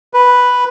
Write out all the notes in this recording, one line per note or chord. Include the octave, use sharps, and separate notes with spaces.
B4